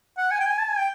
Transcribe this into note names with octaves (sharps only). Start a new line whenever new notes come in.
F#5
G#5
G5
G#5
A5
G#5
G5